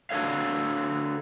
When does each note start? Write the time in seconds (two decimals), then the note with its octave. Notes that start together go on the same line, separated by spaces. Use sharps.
0.10 D4 F#4 A4 C#5 F5